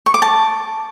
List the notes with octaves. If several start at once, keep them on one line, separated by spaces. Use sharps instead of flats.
C#6
D6
A5